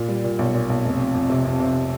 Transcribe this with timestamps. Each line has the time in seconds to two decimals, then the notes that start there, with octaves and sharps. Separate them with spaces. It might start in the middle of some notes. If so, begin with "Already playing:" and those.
Already playing: A#2
0.09 G3
0.24 A#2
0.39 B1
0.54 A#2
0.69 B1
0.84 F1
0.99 F2
1.15 F2
1.30 C3
1.45 F2
1.60 C3